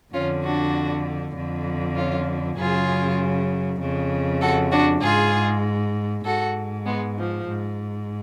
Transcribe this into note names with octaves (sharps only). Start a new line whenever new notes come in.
F2 D3 C#4 F4
D4 F#4
F2 D3
C#4 F4
F#2 C#3 F4 G#4
F2 C#3
F#4 A4
D4 F#4
G#2 F4 G#4
G#2 F#4 A4
G#3 B3
F3
G#2